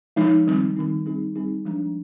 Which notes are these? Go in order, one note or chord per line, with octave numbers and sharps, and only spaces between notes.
F3 G#3 D#4
D#3 G3 C4 D#4
D#3 G3 C4 D#4
G3 C4 D#4 G#4
G3 C4 D#4 G#4
F3 G#3 D4